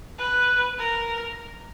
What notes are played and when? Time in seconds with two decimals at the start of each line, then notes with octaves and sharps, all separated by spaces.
0.18 B4
0.79 A#4